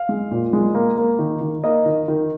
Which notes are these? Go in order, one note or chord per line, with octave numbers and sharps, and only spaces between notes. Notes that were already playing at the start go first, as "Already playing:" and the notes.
Already playing: F5
G#3
A#2
G#3
A#3
A#3
D#3
D#3
A#3 D#5
D#3
D#3